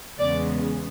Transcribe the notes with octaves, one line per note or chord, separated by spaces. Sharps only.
E2 C#3 G#3 B3 D5